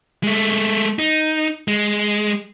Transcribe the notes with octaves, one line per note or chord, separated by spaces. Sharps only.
G#3 A3
D#4
G#3